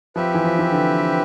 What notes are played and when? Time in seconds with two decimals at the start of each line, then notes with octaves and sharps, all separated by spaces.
0.16 F3 C4 G4 B4 E5
0.34 E3
0.44 F3
0.59 E3
0.72 D3